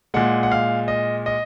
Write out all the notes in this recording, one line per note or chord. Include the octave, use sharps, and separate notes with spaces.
A#2 G#3 F#5
F#5
F5
D#5
D#5